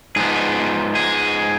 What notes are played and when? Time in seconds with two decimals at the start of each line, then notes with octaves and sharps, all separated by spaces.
0.16 G#2 F3 B3 G#4
0.95 G#4